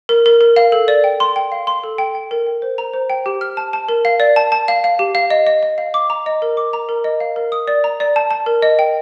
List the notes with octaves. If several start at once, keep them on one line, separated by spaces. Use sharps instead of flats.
A#4
A#4
A#4
F5
A4
D5
G5
C6
G5
F5
C6
A4
G5
G5
A#4
G5
C5
A#5
C5
G5
G4
F6
A5
A5
A#4
F5
D5
A5
A5
F5
F5
G4
F5
D#5
D#5
D#5
F5
D6
A#5
D#5
A#4
D6
A#5
A#4
D#5
F5
A#4
D#6
D5
A#5
D5
A5
A5
A#4
D#5
G5